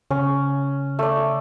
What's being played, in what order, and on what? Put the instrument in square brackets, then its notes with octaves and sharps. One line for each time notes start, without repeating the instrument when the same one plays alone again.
[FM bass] C#3 [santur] C#4
[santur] A3 D5